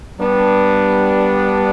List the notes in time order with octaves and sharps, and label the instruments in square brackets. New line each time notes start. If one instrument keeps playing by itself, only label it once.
[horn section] G3 B3 D4